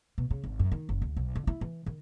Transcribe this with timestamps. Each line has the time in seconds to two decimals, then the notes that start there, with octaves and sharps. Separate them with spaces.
0.18 B2
0.31 C#3
0.44 G#1
0.59 F#2
0.72 D#3
0.89 F#1
1.02 D2
1.17 B1
1.36 D3
1.47 E4
1.61 E3
1.86 D#3